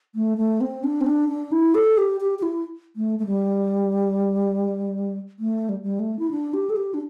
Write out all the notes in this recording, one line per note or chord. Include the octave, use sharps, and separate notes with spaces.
A3
A3
C4
D4
C4
D4
D4
E4
A4
G4
G4
G4
E4
A3
A3
G3
A3
G3
G3
A3
E4
D4
G4
A4
G4
D4